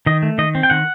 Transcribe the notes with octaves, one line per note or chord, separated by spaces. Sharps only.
D#3 D#5
A3
D#3 D#5
C4
G5
D#3 F#5